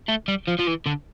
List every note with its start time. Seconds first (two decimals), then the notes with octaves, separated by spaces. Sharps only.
0.09 A3
0.28 G3
0.47 F3
0.59 F3
0.67 E3
0.86 D3